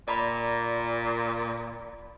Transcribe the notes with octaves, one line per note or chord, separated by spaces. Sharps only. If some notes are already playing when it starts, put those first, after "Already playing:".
A#2 D5 A#5 B5